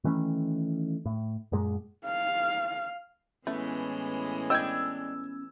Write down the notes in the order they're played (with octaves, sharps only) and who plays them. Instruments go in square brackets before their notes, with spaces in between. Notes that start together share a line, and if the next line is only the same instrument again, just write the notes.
[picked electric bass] D#3 E3 A3 C#4
A2
F#2 A#2 G#3
[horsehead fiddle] F5
[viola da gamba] A2 E3 G#3 [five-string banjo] A3 [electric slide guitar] B3 C#4 B4
[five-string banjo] D4 D#5 G5 [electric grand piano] E6 G#6